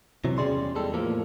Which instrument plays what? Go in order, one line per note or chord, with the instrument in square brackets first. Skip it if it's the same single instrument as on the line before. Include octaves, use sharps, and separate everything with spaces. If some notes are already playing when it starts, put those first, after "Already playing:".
[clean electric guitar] C3 E3 F#3
E2 G3 C#4 G#4 D5 C6
E2 G3 G#3 A4
E2 A2 F3 A#3